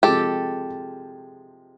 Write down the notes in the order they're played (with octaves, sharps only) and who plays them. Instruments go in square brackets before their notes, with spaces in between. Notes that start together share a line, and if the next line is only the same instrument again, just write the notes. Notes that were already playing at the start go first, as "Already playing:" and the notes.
[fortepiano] C3 F3 G#3 [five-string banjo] G4 A4